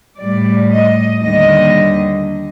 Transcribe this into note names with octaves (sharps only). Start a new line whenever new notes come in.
A2 G3 D5
D#5
D#2 D3 G3 D#5